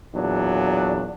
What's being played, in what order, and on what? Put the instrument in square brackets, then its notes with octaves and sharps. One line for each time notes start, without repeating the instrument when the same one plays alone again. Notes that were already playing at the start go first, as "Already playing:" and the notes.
[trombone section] E2 A#2 F#3 D4